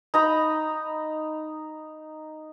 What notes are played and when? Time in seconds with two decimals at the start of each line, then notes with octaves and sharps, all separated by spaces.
0.14 D#4 A#5 B5